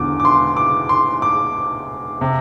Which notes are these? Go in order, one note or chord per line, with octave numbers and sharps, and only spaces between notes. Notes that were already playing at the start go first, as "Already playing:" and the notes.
Already playing: E1 E2 D3 D6
D6
C6
D6
C6
D6
C3